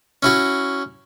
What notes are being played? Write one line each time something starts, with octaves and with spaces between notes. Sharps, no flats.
C#4 E4 F#4